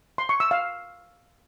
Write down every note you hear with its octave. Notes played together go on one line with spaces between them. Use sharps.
C6
C#6
E6
F5